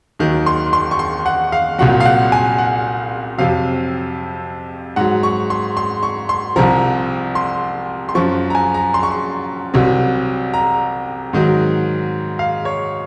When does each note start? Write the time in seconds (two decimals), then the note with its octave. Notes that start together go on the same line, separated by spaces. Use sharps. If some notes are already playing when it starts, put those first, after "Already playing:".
0.19 D#2 D#3 F#3
0.46 C6
0.73 C6
0.91 C#6
0.99 C6
1.26 F#5
1.52 F5
1.78 C2 A#2 F#3 F#5
2.00 F5
2.05 F#5
2.32 G#5
2.58 F#5
3.38 F2 C3 F#3 F5
4.96 G#2 F#3 F#5
5.23 C#6
5.50 C6
5.77 C6
6.03 C#6
6.29 C6
6.56 C2 C3 F3 A#5
7.35 C6
8.09 C6
8.15 F#2 F3 C#6
8.50 A#5
8.55 G#5
8.74 A#5
8.94 C6
9.03 C#6
9.11 C6
9.74 C2 C3 F#3
10.54 A#5
11.33 G#2 D#3 F#3
12.39 F5
12.65 C#5